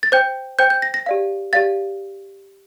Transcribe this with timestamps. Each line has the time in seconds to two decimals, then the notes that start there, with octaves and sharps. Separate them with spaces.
0.03 A6
0.12 C5 G5 G6
0.59 C5 G5 G6
0.70 G6
0.82 A#6
0.94 A#6
1.06 G4 D5 F5
1.53 G4 D5 F5 A6